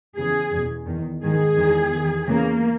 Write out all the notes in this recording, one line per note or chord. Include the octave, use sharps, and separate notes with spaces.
E2 C#3 E3 G#4
E2 B2
E2 D#3
G#2 D#3 G#4
E2 D#3
E2 D#3
E2 C#3 E3 A#3